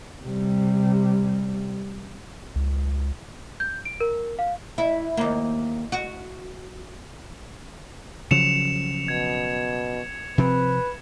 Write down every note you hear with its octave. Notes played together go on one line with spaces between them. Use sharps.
C3 G3
C#2
G6
D7
A#4
F5
E4
D#2 A#3
F#4
C#3 F3 F#3 C#7 E7 F7
B2 G#6
C3 F3 C4 B4